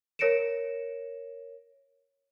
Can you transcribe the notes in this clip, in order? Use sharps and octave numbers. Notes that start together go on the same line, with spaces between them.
A#4 C#5 A#6 C#7 D7 E7